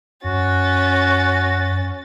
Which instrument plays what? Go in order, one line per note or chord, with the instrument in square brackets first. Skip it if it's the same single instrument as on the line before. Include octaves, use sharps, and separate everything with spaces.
[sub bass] F#2 [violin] C#4 A6 [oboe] F#4